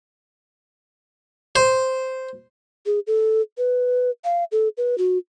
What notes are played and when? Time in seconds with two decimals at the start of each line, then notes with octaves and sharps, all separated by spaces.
1.56 C5
2.86 G#4
3.07 A4
3.58 B4
4.25 F5
4.52 A4
4.78 B4
4.98 F#4